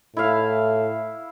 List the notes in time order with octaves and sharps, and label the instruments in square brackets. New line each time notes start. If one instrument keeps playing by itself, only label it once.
[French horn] A2 [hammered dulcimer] E4 F5